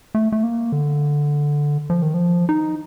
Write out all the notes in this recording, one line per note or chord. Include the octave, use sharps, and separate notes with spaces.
A3
A3
A#3
D3
F3
D#3
F3
D#4